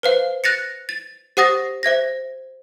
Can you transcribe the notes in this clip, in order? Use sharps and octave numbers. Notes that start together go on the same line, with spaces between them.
B4 C5 F5
F#6 A6 A#6 C#7
A6
G4 C5 F#5 D#6 A6 A#6
C5 E5 G#6 A#6